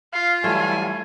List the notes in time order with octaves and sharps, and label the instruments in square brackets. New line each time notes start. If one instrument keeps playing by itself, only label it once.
[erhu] F4 [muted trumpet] F5
[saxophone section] E3 F#3 G3 [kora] A3 [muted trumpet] G#5